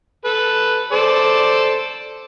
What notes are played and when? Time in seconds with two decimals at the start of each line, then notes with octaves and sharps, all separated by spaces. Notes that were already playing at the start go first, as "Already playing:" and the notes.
0.25 A4 B4
0.92 A4 C5 D5